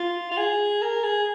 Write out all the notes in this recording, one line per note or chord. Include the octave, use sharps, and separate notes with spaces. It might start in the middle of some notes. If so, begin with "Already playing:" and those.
Already playing: F4
F4
G#4
A#4
G#4